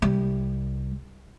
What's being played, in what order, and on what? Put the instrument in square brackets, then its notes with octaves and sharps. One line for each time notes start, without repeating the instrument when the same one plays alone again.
[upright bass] C2 G3